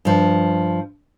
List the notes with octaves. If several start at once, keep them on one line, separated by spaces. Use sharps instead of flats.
G2 F3